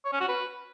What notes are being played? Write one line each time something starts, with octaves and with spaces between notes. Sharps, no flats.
C#5
C#4
F#4
B4